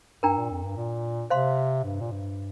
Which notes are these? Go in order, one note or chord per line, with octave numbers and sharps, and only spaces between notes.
G2 D4 A#4 G5 A#5
A#2
F2
G2
A#2
C3 C5 F5 C6
G2
A#2
G2